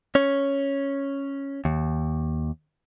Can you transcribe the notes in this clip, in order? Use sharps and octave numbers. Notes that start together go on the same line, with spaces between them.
C#4 C#5
D#2